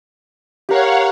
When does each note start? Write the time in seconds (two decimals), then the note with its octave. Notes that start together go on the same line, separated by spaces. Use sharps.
0.69 G4 A#4 C#5 F5 F#5